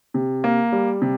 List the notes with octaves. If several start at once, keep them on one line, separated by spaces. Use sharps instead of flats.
C3
A#3
G3
C3